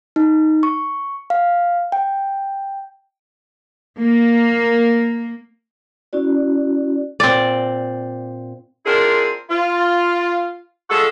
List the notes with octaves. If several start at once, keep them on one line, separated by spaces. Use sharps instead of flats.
D#4
C#6
F5
G5
A#3
C#4 E4 F#4 D5
A#2 C4 D5
C4 D4 E4 F4 G#4 A#4
F4
F3 G#3 F#4 A4